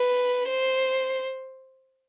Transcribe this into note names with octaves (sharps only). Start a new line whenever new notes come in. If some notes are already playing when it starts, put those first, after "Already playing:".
Already playing: B4
C5